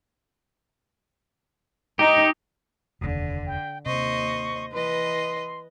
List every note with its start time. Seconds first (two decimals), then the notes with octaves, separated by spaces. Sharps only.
1.99 D#4 G4
3.01 F1 D#2 D3
3.47 G5
3.86 D#2 C3 C5 D#5 C#6
4.72 E3 B4 D#5 C6